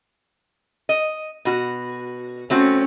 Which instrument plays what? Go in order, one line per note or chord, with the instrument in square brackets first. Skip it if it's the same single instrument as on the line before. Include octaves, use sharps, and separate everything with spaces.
[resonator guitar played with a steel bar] D#5
B2 F#4
[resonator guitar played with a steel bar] A3 C4 F#4 [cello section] C#4